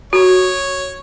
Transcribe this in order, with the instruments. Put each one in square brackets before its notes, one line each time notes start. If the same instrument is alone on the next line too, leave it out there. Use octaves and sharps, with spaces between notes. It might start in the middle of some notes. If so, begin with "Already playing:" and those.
[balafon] F#4 [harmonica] C#5